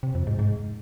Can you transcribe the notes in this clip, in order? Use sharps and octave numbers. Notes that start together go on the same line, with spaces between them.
C3
F2
G#2
G#2